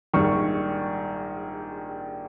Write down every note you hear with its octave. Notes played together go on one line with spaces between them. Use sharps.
A#1 G#2 D#3 G3 C#6